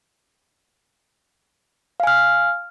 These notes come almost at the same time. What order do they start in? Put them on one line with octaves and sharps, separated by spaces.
F5 G#5 F6